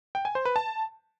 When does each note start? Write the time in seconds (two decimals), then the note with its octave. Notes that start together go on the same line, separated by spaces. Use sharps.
0.15 G5
0.25 G#5
0.35 C5
0.45 B4
0.56 A5